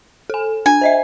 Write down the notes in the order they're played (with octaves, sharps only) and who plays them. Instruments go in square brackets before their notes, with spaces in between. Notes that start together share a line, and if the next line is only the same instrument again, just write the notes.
[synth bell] A4 G#5
[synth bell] D4 [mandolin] G#5
[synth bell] C5 D#5 E5